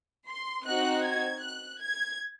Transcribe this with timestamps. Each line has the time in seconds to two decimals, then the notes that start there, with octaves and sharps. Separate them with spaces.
0.27 C6
0.66 C4 D#4 F#4 F#6
1.05 G#6
1.43 F#6
1.81 G#6